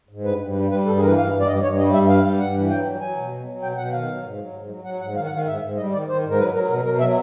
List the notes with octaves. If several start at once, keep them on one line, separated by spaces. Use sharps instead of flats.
G#2
G2 B4
G2
G3
G3 B4
G2 A4
G#4
E3 A#4
B4
G2 F5
G2
D5
G2 D#5
G2 C#5
G3 D#5
G2 E5
G3 F5
G2
G2 F#5
E3
F#3 G5
F#3
F#3 G#5
B2
F#3
F#3
B2 G5
B2 F#5
D#3 F5
F#3
G#2
F#3
G#2
F#3
F#3 F#5
G#2 F#5
D#3 F5
F#5
D#3
F5
G#2 E5
G#2
G3 D#5
D#3 D5
D#3 C5
G#2
A#4
F#3 B4
F#3 A#4
B2 A#4
B2 A#4
F#3 E5